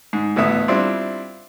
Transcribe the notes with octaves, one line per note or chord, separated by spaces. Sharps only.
G#2
A1 D2 B3 E5 D#6
G3 C4 D4 E4 F4